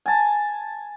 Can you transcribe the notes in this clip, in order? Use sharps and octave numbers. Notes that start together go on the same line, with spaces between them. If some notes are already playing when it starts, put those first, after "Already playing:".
G#5 A5